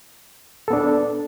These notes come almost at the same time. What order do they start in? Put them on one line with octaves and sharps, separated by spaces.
A4 B3 D4